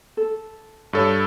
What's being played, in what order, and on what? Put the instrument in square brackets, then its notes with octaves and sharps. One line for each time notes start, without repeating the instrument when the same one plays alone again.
[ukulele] A4
[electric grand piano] G2 A4 C#5